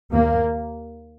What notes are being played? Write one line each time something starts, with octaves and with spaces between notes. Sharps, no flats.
D#2 A#3